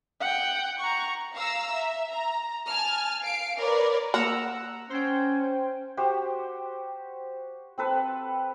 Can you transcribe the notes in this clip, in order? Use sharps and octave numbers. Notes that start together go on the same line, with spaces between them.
F#5 G5
A#5 C#6
F5 A#5 E6
E5
A#5
G#5 A5 F6
F5 C7 D7
A#4 B4 C#5 D5
A#3 F#5 A#5 E6
C#4 C5 G5
F#4 G4 C5
C4 A4 B4